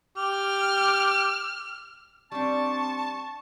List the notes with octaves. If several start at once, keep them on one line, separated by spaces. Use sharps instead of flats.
G4 F6
G3 C4 D4 A5 C#6